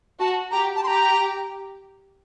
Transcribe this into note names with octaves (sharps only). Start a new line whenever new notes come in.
F#4 A5
G4 A#5
A5
G4 A#5 C6